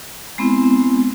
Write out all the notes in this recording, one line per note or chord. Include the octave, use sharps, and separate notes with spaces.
G#3 B3 C4 E4